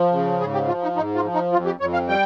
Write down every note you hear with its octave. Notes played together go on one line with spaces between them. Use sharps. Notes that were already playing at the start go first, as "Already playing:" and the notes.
Already playing: F3
C#3
G#2 G#4
G4
F3 F4
D#4
G#2 D#4
F4
F3
D#4
F2 F4
G4
F2 C#5
F5
G3 G5